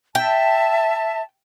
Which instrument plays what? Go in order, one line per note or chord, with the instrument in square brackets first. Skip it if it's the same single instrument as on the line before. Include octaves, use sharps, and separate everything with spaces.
[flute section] E5 A5 [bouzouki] G5